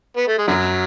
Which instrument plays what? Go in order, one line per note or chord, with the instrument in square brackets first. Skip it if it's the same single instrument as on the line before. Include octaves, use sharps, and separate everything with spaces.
[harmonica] B3
A3
G#3
[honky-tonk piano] F#2 [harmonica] D3 F#3